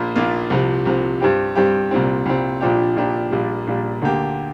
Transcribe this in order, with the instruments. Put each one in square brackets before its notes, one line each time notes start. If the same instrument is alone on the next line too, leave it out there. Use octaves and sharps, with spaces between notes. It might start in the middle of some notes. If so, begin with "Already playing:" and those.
Already playing: [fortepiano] A#1 A#2 A#3 F4
A#1 A#2 A#3 F4
C2 C3 F3
C2 C3 F3
G2 G3 C4 G4
G2 G3 C4 G4
C2 A#2 G3 C4
C2 A#2 G3 C4
A#1 A#2 F3 D4 G4
A#1 A#2 F3 D4 G4
A#1 A#2 G3
A#1 A#2 G3
D2 D3 A#3 G4